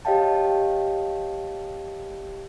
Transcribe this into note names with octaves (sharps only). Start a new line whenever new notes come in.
G4 C#5 D#5 F5 G5 A5